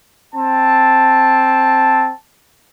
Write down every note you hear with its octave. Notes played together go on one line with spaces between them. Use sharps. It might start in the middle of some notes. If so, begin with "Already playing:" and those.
C4 A5